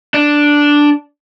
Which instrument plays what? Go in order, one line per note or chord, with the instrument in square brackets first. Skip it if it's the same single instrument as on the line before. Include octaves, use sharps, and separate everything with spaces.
[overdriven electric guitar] D4